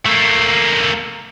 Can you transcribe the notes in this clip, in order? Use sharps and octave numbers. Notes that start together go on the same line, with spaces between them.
A3 A#3